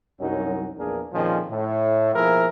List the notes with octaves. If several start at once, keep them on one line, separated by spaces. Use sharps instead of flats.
C2 F#2 F#3 C#4 D#4
A#1 E2 A#3 D4 G#4 A#4
F2 A#2 D#3 F3 C#4 G#4
A2
B2 F3 A#3 E4 G#4 A#4